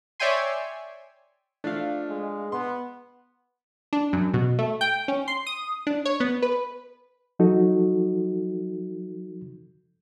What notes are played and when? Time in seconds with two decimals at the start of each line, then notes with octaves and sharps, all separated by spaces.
0.20 C#5 D5 E5 G5 G#5 C6
1.64 F3 A3 D4 F5
2.09 G#3
2.52 B3 C6
3.93 D4
4.13 F#2
4.34 B2
4.59 A3
4.81 G5
5.08 C#4
5.28 C6
5.47 D#6
5.87 D4
6.05 C#5
6.20 B3
6.42 B4
7.39 F3 F#3 D#4 F#4 A4